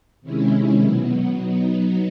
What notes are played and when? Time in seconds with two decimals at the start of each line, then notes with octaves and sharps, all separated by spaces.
0.22 C3 D#3 G#3 C#4 E4
0.81 B2 F#3 B3
1.38 F#3 B3 D#4